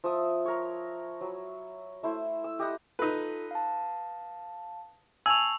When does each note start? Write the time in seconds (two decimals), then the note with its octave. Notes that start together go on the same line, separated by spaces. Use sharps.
0.04 F3 E5 D#6
0.45 A#4 C#5
1.21 F#3 B5
2.03 A3 E4 C5
2.44 E6
2.59 G4 D#5 F#5 B5
2.99 D#4 F4 A4 B4
3.51 F5 A5
5.26 G#5 A5 C#6 E6 F7